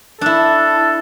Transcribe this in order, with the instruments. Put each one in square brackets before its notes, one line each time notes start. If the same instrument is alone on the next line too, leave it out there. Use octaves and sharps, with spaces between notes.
[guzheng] D4 E4 [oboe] A4